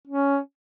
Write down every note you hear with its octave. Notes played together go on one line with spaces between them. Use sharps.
C#4